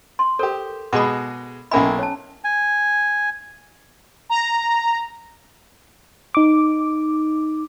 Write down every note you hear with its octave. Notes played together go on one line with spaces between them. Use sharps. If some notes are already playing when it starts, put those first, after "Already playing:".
C6
G4 A4 A#4 C5
B2 G#3 G#4 B5 D6
B1 A#3 C#4 E4 G#5 B5
C#5 A5
G#5
A#5
D#4 D6